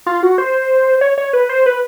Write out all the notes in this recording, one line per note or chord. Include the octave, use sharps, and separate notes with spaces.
F4
F#4
C5
C#5
C#5
B4
C5
B4